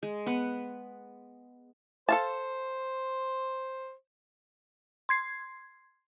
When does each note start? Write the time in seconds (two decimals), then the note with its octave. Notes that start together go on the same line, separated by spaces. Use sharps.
0.03 G#3
0.26 B3 B4 F#5
2.09 A4 C5 F5 A5
5.09 C6 G#6 C7